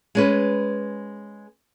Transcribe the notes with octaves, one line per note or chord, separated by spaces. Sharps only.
G#3 C#4 B4